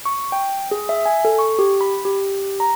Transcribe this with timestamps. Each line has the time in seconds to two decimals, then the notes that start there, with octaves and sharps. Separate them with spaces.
0.05 C#6
0.32 G5
0.71 G#4
0.89 E5
1.06 G#5
1.25 A4
1.39 C#6
1.59 G4
1.81 B5
2.05 G4
2.60 A#5